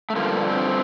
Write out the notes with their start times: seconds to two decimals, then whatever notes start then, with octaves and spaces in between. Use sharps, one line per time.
0.10 A3
0.16 G2 D3 F3 A#3
0.49 C4